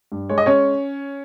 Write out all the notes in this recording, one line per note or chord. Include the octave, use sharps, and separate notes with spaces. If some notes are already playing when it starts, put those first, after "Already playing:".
G2
G#3 C#5
D#5
C#4 C#5